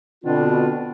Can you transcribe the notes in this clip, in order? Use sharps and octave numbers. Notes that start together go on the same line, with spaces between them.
B2 D3 C4 D4 F4